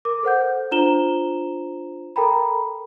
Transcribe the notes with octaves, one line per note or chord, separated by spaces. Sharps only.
A#4 D6
A4 C5 F#5 G6
D4 F4 C5 A#5 E7 G7
A4 A#4 G5 A#5 B5